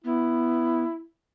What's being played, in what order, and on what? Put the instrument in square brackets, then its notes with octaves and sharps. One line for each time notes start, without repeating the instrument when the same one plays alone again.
[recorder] B3 [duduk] E4